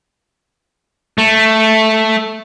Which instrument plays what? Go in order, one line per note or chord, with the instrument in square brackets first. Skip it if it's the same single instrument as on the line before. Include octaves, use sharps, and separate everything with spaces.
[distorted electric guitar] A3